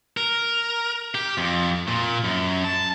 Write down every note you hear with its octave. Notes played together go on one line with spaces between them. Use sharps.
A#4
G4
F2
A#2
F#2
A5